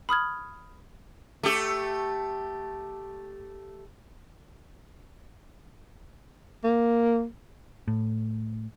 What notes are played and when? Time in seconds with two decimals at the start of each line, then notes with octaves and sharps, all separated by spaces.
0.09 B5 D#6 F6 G#6
1.43 A3 G4
6.64 A#3
7.88 A2